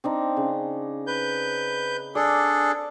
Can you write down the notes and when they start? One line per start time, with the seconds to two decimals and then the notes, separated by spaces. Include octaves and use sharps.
0.04 C4 D4 D#4
0.37 C#3
1.07 B4 G6
2.15 D4 G#4 A4 D5